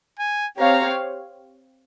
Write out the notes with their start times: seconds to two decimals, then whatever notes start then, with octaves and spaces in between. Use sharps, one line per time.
0.19 G#5
0.59 C4 G4 C#5 F5 A#5